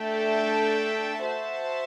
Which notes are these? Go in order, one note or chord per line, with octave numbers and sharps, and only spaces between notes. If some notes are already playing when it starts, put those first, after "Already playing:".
Already playing: A3 D4 A4 E5 G5
F#4 C5 E5 A5